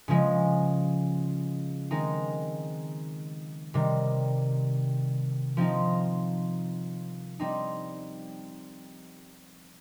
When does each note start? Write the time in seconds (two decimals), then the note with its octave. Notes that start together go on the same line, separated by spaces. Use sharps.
0.08 C#3 F3 G#3
1.91 D#3 G#3 C4 D#4
3.74 C3 D#3 G3
5.57 F3 C4 D#4
7.40 G3 C4 D#4